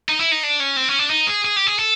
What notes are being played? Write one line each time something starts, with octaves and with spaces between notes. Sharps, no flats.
D#4
E4
D#4
D4
C#4
C4
C#4
D4
D#4
G#4
G#4
G4
G#4
A4